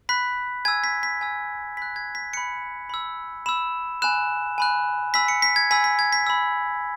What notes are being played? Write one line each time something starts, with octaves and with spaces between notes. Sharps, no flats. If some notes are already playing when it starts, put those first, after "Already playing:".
B5 F#6 B6
G#5 E6 G#6
B6
B6
G#5 E6
B5 F#6 B6
G#6
B6
B5 F#6 C#7
B5 E6
B5 E6 E7
G#5 B5 F#6 E7
G#5 B5 F#6
G#5 B5 E6 B6
C#7
B6
G#6
G#5 B5 E6 B6
B6
G#6
B6
B5 E6